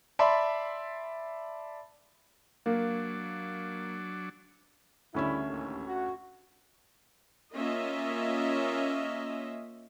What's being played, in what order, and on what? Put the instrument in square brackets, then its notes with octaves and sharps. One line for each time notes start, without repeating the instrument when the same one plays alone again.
[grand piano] D5 E5 A5 B5 C6
[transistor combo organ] F#3 D4 [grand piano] A#3
[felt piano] D2 C#4 E5 [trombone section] C#3 G3 E4
[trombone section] A1 D#2
F#4
[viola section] A#3 C#4 F4 D#5 E5